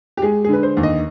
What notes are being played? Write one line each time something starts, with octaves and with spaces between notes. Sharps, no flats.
G4
G#3 G#4
G#4
D3 B4
C5
D#2
D#5